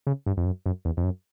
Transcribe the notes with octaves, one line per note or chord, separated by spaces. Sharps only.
C#3
G2
F2
F#2
F#2
E2
F2
F#2